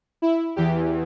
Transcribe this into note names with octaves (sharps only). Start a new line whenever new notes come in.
E4
E2 E3 G4